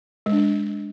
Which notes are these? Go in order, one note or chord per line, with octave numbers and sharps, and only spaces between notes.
G#3
D4
G#3